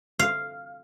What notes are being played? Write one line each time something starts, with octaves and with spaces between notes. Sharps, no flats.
F5